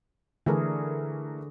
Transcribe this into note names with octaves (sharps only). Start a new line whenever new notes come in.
D3 E3 A3 G#4 A#4